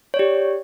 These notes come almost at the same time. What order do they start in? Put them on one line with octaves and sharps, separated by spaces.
C#5 D5 G4